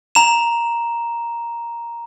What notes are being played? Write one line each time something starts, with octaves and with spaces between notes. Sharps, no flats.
A#5 E7